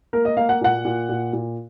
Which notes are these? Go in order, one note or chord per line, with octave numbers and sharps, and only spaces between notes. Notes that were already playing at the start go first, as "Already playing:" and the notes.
A#3 A#4
D#5
A#3 F5
F#5
A#2 F#5
A#2
A#2
A#2